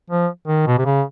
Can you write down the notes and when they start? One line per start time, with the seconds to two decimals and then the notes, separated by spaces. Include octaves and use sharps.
0.10 F3
0.48 D#3
0.67 B2
0.78 C3
0.85 C#3